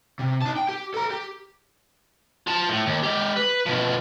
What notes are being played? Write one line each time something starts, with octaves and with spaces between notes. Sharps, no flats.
C3
D#4 A5
G5
G4
A4 A#5
G4
F4 A5
A2
D#2
G#3 G4
B4
B2 F3